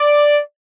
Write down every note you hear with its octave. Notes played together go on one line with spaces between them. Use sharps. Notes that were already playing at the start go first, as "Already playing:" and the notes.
Already playing: D5